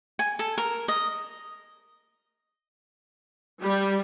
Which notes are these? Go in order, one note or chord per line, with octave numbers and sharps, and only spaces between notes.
G#5
A4
A#4
D#5
G3